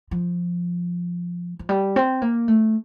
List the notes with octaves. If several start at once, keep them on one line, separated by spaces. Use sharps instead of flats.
F3
F3
G3
C4
A#3
A3